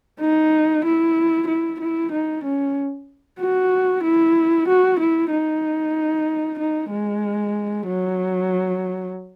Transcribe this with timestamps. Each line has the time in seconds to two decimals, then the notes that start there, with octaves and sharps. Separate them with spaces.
0.21 D#4
0.85 E4
1.48 E4
1.80 E4
2.12 D#4
2.44 C#4
3.40 F#4
4.03 E4
4.68 F#4
5.00 E4
5.31 D#4
6.59 D#4
6.91 G#3
7.87 F#3